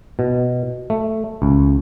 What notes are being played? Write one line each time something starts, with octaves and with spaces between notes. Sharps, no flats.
B2
A3
C#2